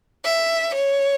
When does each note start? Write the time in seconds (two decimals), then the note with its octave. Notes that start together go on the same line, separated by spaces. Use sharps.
0.25 E5
0.75 C#5